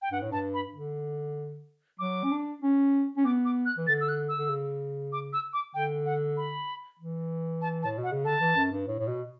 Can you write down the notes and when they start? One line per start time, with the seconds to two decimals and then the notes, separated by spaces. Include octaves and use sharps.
0.02 G5
0.11 G2 F#5
0.22 A2
0.31 G2 A5
0.54 B5
0.75 D3
1.99 F#3 D6
2.24 C#4
2.31 D4
2.62 C#4
3.17 C#4
3.25 B3 D6
3.45 D6
3.66 F#6
3.78 E3
3.87 D3 A6
4.01 E6
4.09 F#6
4.29 E6
4.39 D3
4.50 C#3
5.13 D6
5.33 E6
5.53 D6
5.74 D3 G5
6.05 F#5
6.37 B5
6.99 E3
7.62 A5
7.83 A2 A5
7.98 B2
8.04 F#5
8.11 C#3
8.25 D3 A5
8.40 E3
8.56 F#2
8.72 G2
8.87 A2
8.99 A2
9.08 B2